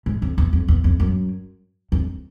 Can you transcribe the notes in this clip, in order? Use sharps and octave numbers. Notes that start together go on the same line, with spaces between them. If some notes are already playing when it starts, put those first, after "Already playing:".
G#2
F2
E2
F2
E2
F2
F#2
F2